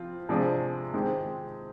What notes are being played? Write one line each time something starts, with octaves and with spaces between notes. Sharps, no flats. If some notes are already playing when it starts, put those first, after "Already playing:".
Already playing: F3 C4 F4
C3 F3 G#3 D4 G#4
D#3 G#3 C4 G4